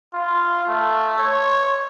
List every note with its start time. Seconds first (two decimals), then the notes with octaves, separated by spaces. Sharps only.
0.14 F4
0.67 A3
1.18 C#5